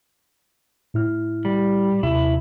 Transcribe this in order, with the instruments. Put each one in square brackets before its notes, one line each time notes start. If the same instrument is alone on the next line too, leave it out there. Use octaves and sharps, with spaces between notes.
[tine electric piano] A2 E4 F6
[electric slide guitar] G3
[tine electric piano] D#2 C3 [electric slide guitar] E4